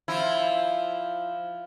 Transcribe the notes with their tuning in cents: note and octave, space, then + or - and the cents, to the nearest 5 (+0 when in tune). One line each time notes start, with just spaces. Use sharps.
F3 +0 E4 +0